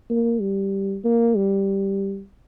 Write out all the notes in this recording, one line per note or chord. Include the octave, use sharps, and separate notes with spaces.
A#3
G3
A#3
G3